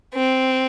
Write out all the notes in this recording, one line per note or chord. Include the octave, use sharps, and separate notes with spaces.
C4